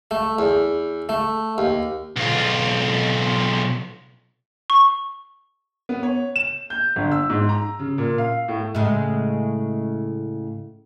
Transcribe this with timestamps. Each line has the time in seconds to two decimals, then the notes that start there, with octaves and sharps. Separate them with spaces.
0.11 A3
0.39 E2
1.09 A3
1.58 D#2
2.17 B1 F4
4.70 C#6
5.89 B3
6.03 C#5
6.36 E7
6.70 G6
6.96 G1
7.12 E6
7.30 G#2
7.49 A#5
7.79 C#3
7.98 A#2
8.18 F5
8.48 A2
8.75 A2 C#3 G#3